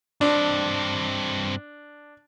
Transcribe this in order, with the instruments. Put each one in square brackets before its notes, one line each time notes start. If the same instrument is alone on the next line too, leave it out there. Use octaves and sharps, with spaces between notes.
[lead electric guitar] G2 C4 [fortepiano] D4